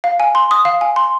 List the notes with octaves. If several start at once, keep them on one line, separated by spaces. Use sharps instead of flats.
F5
G#5
C6
D#6
F5
G#5
C6